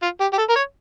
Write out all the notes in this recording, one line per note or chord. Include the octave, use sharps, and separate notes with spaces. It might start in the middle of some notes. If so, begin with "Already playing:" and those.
F4
G4
G4
A4
A#4
C#5